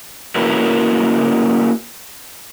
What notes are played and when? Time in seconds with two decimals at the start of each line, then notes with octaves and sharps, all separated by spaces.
0.35 A#3 C#4 E4 F#4 A#4 B4